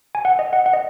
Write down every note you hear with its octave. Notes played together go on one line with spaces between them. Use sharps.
G#5
F#5
D#5
F#5
F#5
D#5